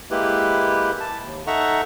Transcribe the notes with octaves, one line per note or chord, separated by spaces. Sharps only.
G#3 A#3 E4 G4 B4
A5
D#2
D#4 A4 E5 F#5 A#5 C#6